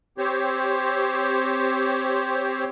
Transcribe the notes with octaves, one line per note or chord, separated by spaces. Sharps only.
C4 G4 C5 C#5